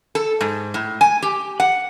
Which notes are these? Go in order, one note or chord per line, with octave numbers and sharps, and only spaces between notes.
A4
G#2
A2
G#5
G4
F#5